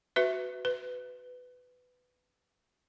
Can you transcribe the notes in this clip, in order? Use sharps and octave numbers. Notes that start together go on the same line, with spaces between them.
F#4 B4 E5
B4